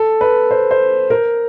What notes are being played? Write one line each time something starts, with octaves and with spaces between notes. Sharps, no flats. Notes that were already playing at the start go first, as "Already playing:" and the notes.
Already playing: A4
B4
C5
C5
A#4